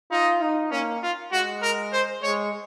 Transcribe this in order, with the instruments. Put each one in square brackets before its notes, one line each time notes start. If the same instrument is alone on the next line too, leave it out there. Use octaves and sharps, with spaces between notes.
[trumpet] D#4 [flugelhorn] F4
[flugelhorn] D#4
[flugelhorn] A#3 [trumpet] C#4
[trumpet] F4
[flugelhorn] G#3 [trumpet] F#4
[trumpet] A#4
C5
[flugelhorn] G#3 [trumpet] C#5